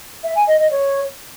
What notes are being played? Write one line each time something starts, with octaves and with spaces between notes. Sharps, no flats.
E5
G#5
D#5
D#5
C#5